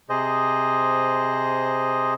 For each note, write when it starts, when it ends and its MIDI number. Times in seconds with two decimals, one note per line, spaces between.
0.10 2.14 48
0.10 2.14 68
0.10 2.14 72
0.10 2.14 75